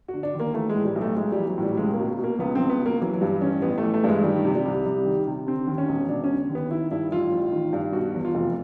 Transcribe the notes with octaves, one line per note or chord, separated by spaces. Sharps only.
F#4
D3
D4
D#2 A#3
E3 A3
G#3
A2
G3
B1
A3
B1 G#3
E3 G3
F#3
A2
G3
C#2 G#3
A#3
B2
B2
A#3
C#2 B3
C#2 C4
B3
B2 A#3
E3 F#3
F#3
G2 G3
A1 C#4
A1 B3
A3
E3
A3
G2 G#3
D#3 G3
C3
G3
C2
C2
D#3
C3
D3 C4
D#2
C#4
E1
E1 D4
C#4
D3
D#2
B3
D#3 E4
G2 E4
A1 F4
A1
D#3
G2
B2 F#4
E2
F4
F1